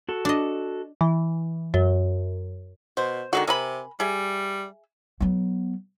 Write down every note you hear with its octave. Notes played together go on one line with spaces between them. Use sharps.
F#4 A4
D4 D#5
E3
F#2
B2 C5
D3 D#3 G#3 F#4
C3 A#4 G#5 B5
G3 G#4 E5
F#3 B3